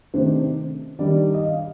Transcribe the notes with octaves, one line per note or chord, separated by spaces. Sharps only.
C3 D#3 A3 D4 C5
D#3 G3 D4 D5
D#5
F5